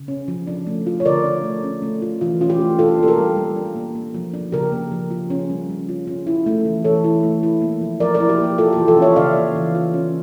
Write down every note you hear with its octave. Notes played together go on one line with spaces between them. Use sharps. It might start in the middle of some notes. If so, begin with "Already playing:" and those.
Already playing: C#3
C#4
F3
D4
A3
F4
C#5
D3 A#4 D5
D4
A3
C#4
A3
F4
E3 F4
C#4 F4
G4
A3
D4 F4 A4
A#3 A4
G4 A#4
G3
G3
D4
A#3
A#3
F3
D4
C#3 G4 A#4
A#3
F3
F4
C#4
G3
G3
F4
C#4
E4
A3
E3
E3 A4 C#5
E4
A3
E4
A#3
F3
F3 A#4 D5
A#4 D5
E4
G4
A#3 G4
A#3 F4 A4
G4
E3
F4 A4
C#4
C#5 E5
C#3 D5 F5
A#3
E3
F4
C#4